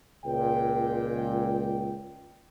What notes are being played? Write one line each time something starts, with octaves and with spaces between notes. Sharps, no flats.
C#2 A#2 G5